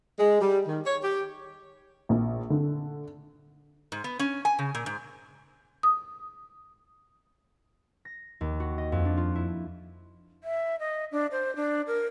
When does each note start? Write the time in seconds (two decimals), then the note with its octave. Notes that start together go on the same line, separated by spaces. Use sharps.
0.19 G#3
0.41 G3
0.67 D#3
0.86 C#5
1.03 G4
2.09 A#1
2.50 D3
3.92 G#2
4.04 B3
4.19 C#4
4.45 G#5
4.59 C#3
4.75 A#2
4.86 G#2
5.83 D#6
8.05 A#6
8.41 D#2
8.60 F#4
8.78 D#5
8.92 F2
9.05 D4
9.17 F4
9.35 E4
10.43 E5
10.79 D#5
11.12 D4
11.31 C5
11.56 D4
11.87 A#4